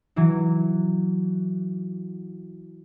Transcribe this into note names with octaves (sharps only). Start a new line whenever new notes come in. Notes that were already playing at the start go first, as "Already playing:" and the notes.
E3 F#3 E4